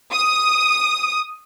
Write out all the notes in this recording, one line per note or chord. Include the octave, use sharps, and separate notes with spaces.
D#6